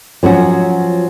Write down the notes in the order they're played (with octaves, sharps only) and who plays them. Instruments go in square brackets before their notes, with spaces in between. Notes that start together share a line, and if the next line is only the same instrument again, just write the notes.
[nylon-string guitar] F3 F#3 C#4 F#4